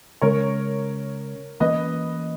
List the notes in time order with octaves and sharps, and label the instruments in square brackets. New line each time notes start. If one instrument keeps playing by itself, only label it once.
[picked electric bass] C#3 G#3 C#4 [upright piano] A#4 C#5
[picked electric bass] E3 A#3 C#4 [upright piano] B4 D#5